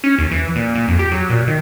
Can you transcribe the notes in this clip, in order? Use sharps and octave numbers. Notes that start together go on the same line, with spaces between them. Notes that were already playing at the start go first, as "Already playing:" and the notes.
C#4
D#2
E3
A#2
A#2
F2
G4
F#3
A#2
D#3